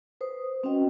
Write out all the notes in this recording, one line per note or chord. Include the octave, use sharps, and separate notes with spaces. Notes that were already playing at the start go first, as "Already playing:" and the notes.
B4 C5 D#6
C4 C#4 F#4 B4 D#5 G5